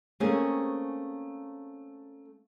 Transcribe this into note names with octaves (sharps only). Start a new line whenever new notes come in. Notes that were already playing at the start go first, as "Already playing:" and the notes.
A3 A#3 C4 C#4 G#4